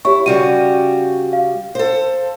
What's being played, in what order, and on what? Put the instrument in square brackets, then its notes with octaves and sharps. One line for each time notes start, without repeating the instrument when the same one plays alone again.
[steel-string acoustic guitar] E4 [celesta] G4 C#5 C#6
[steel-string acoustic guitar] C#3 G3 F#4 [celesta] D#7
[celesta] F5
[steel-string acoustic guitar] A4 C5